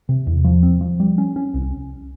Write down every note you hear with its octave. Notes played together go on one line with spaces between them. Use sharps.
C3
E2
F3
C4
F3
G3
C#4
C#4
C2